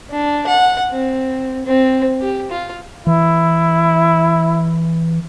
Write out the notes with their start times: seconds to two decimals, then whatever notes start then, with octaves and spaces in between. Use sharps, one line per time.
0.11 D4
0.47 F#5
0.92 C4
1.66 C4
2.21 G4
2.51 F4
3.07 E3 E4